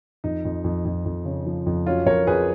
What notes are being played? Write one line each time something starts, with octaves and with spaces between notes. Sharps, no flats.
F2 D#4
F2
F2
F2
F2
C#3
F3
F2
F#3 C#4 F4
F2 A#4 C#5
F2 G#4 B4